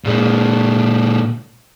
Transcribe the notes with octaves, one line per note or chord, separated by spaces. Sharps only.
A#2 G#3